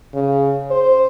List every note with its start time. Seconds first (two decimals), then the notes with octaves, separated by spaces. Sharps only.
0.14 C#3
0.71 C5